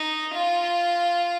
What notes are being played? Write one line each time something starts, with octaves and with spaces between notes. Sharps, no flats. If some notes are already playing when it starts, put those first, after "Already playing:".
Already playing: D#4
F4